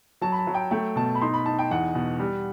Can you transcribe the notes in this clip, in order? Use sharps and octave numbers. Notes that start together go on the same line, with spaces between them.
F#3 A5
B5
A5
F#3
G5
A3 G5
B2 A5
B5
D#4 C6
B5
D#4 A5
G5
E2 F#5
B2
G3